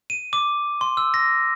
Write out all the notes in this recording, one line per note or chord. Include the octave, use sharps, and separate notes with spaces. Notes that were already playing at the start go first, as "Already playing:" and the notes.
D#7
D6
C6
E6
A#6